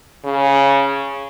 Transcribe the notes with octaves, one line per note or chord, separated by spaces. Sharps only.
C#3